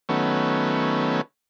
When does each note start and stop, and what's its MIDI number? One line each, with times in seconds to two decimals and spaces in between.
0.09 1.21 51
0.09 1.21 54
0.09 1.21 57
0.09 1.21 59
0.09 1.21 61